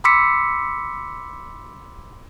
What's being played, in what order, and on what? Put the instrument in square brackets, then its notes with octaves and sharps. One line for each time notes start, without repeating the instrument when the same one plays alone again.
[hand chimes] B5 C6 D6 E6 B6 C#7